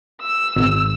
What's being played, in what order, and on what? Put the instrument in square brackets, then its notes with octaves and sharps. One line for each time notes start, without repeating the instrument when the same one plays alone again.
[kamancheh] E6
[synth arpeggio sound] G#1